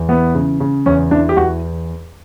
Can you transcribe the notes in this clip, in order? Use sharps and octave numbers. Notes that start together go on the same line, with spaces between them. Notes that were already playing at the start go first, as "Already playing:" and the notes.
Already playing: E2
E3 B3
C#3
C#3
E2 C#4
E3 D4
G4
E2 F#4